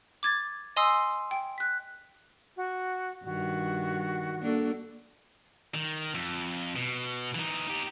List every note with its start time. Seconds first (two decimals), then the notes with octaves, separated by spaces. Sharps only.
0.23 D6 G#6 A6
0.76 D#5 G#5 C6 D#6 E6 C7
1.31 G5
1.58 F#6 B6
2.56 F#4
3.24 G2 D#3 F#4
4.41 A#3 D4 A4
5.74 D#3
6.14 F2
6.76 B2
7.35 E3 D#4
7.68 D#4 G4